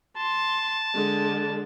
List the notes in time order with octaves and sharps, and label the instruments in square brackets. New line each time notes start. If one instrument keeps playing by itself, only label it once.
[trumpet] A5 [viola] C6
[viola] D3 G#3